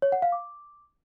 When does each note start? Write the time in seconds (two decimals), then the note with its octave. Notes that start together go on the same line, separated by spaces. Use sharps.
0.02 C#5
0.12 F#5
0.22 F5
0.32 D6